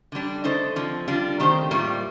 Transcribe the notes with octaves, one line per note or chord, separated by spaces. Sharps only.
D3 G3 D4
D3 A3 D#4 A4 C5
D3 F3 C4
D3 G3 D4 F4
D#3 A3 C4 G4 C5
A2 G3 A#3 F4